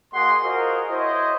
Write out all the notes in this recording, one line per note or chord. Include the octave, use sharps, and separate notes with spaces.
A#3 F#4 G#4 D#5 F#5 C6
F4 F#4 G#4 A#4 C5 D#5
E4 C5 C#5 D#5